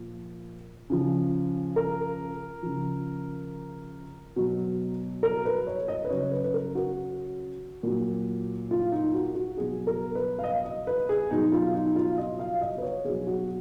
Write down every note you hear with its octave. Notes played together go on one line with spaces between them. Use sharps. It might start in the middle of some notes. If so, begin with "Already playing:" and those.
Already playing: A#2 F3
C#3 F3
A#4
C#3 F3
B2 F#3
A#4
B4
C#5
D#5
B4
C#3 F#3 C#5
B4
B4
A#4
F#4
A#2 F#3
F4
D#4
F#4
F#4
B2 F#3 G#4
A#4
B4
F5
D#5
D#5
B4
G#4
B2 F#3 D#4
F4
D#4
F4
D#5
F5
D#5
B4
C#5
B2 F#3 G#4
F#4